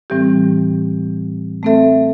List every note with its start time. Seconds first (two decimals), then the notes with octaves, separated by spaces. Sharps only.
0.10 A2 E3 G3 C4 G4
1.63 A3 C4 A4 E5